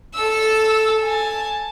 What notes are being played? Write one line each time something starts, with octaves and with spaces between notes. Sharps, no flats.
A4 E6
G#5 A5